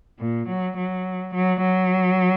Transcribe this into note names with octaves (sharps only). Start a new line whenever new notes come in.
A#2
F#3
F#3
F#3
F#3